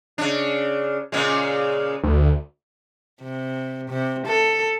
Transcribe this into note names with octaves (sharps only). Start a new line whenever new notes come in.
C#3 D4
A#2 C#3 G#3
D2
C3
C3
A4